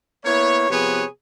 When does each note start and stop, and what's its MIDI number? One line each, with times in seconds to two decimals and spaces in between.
0.25 0.66 58
0.25 0.66 59
0.25 0.66 64
0.25 0.66 73
0.70 1.04 48
0.70 1.04 53
0.70 1.04 59
0.70 1.04 68
0.70 1.04 71
0.70 1.04 73